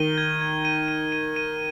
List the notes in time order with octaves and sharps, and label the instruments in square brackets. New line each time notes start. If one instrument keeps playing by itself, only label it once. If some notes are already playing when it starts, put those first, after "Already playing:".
Already playing: [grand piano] D#3 [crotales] D#7 G7
[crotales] G#6
G#6
D#7
D#7
D#7
D#7